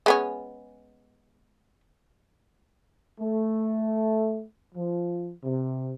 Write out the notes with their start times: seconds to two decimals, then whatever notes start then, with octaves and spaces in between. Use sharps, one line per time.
0.06 G#3 B3 C#4
3.20 A3
4.75 F3
5.44 C3